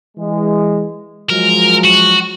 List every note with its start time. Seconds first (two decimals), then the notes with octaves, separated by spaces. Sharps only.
0.17 E3 G#3
1.29 F3 F#3 G#3 A#4
1.84 F#4